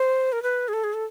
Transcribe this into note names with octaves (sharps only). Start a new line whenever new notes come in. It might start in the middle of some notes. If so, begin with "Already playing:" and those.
Already playing: C5
A#4
B4
G#4
A4
G#4
A4